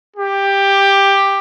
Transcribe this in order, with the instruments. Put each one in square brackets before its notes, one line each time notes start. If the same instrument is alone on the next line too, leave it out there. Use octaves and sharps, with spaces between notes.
[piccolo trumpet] G4